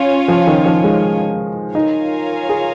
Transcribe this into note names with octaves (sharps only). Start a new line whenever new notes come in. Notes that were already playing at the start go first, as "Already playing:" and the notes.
Already playing: C#4 F4 C#5 G#5
F3
D#3
F3
G#3
D#4 F4 A#4 C#5 F5 G#5
G#4